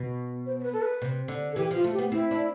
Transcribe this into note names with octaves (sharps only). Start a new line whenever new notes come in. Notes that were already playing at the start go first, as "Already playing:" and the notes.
Already playing: B2
C5
C5
B4
A4
B4
C3
D3
A4
E3 G4
F3 F4
A3
G4
B3
C4 E4
D4